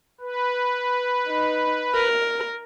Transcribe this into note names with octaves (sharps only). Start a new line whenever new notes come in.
B4
D#4
A#4